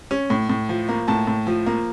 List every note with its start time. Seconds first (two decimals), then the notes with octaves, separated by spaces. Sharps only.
0.11 C#4
0.30 A2
0.49 A2
0.69 F3
0.89 A#3
1.08 A2 A5
1.27 A2
1.47 F3
1.66 A#3